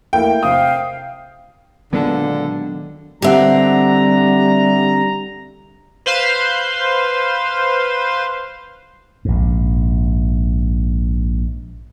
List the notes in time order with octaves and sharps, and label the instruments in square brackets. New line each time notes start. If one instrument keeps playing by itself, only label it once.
[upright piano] A3 A#3 E4 [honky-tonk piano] G5
[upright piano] C3 D#6 [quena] F5
[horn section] A#2 D3 [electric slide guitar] D#3 D4 A5 [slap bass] F#3 G#3 [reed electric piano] B3
[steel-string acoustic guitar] D3 C4 [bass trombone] G3 [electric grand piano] G4 E5 F#5 [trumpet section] A#5
[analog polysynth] B4 C5 F5 C6
[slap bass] A#1 G#2